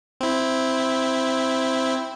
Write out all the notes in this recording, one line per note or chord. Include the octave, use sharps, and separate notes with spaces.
C4 E4